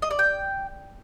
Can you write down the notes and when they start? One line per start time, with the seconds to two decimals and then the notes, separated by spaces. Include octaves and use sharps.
0.02 D#5
0.11 D5
0.19 G5